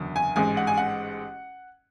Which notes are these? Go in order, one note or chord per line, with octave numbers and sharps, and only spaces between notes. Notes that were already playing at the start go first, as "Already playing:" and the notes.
Already playing: F#1 E2 D3 F#3
G#5
A1 G#2 G#3 G#5
F#5
G#5
F#5